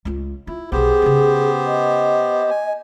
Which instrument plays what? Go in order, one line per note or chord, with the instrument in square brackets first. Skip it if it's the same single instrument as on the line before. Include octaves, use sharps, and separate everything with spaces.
[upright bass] C#2 F4
[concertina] E4 [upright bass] F4
[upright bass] B1 B2 [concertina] B3 G4 C5 [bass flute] G#4
[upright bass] C#3 C#4
[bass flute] D#5
[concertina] G#5